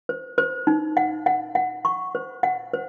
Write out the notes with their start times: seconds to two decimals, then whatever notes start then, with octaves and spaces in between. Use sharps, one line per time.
0.09 C5
0.38 C5
0.67 D#4
0.97 F#5
1.26 F#5
1.55 F#5
1.85 C#6
2.15 C5
2.43 F#5
2.74 C5